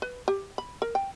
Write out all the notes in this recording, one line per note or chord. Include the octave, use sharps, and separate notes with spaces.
B4
G4
B5
A#4
G5